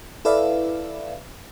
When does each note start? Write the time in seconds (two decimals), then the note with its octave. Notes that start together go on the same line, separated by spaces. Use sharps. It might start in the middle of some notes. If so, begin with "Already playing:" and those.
0.25 E4 A4 B4 D5 E5 F5